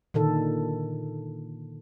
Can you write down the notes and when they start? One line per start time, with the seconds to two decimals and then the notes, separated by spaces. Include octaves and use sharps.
0.14 A#2 D3 D#3 A4